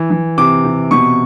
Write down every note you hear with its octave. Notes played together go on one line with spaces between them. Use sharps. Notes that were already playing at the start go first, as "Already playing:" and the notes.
Already playing: E3
E3
C3 D6
C3
B2 C#6